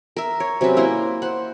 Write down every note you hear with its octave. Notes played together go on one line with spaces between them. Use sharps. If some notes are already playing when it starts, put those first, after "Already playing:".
A#4 E5
C#5
C3 F#3 C#4 B4
A#3 E4 A#5 C6
C5 F#5